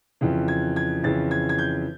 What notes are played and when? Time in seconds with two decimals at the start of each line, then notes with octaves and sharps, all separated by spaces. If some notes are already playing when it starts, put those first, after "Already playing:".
0.21 F2 C#3 E3
0.48 G#6
0.76 G#6
1.03 F2 C#3 E3 A6
1.31 G#6
1.49 G#6
1.59 G6